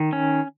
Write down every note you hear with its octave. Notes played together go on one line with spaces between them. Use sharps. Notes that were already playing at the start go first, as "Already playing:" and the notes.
Already playing: D#3
C#4